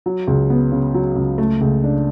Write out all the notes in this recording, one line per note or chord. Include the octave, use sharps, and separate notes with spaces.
F#3
C#2
B3
C#3
F#3
C#2
A3
C#2
D4